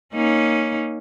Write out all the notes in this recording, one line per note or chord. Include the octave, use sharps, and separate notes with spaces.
A#3 C#4 D#4